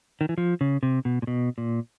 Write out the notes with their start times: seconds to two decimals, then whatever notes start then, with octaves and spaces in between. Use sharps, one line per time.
0.21 D#3
0.29 E3
0.38 F3
0.61 C#3
0.83 C3
1.05 B2
1.22 A#2
1.27 B2
1.58 A#2